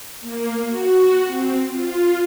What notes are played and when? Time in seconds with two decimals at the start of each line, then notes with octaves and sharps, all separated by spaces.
0.21 A#3
0.66 F#4
1.26 C4
1.70 F4